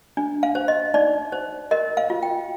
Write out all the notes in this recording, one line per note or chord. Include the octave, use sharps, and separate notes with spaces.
D4
F5
C5
D#5
D#4 D5
C5
A#4 D#5
F5
F4
G5